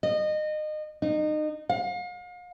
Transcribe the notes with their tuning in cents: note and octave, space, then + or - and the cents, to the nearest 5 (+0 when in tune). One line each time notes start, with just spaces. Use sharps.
D#5 -25
D#4 -30
F5 +40